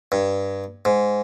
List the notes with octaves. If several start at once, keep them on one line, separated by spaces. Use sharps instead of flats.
G2
G#2